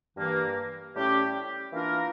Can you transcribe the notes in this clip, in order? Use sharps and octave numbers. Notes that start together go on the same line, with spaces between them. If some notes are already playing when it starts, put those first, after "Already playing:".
G2 E3 A#3
A2 G3 C#4 G4
E3 A#3 D4 F4 A#4